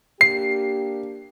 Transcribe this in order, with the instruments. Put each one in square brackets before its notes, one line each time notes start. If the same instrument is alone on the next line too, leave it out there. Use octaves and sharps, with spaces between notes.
[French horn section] A#3 D4 G4 [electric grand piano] C7